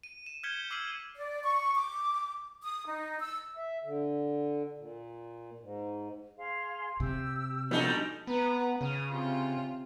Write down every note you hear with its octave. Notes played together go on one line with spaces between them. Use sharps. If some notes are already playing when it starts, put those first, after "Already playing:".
D#7
E7
F6 G6 G#6 B6 C#7 G7
D6 E6 F6 C7 D#7 F#7
D5
C#6
D6
D#6
D#4
E6
E5
D3
A#2
G#2
G#4 F5 C6
C3 G4 E6
A#2 F3 G3 B3 D#4 F#4 A4 G#5
B3 B4 A#5
C#3 D#6 F6
C3 F4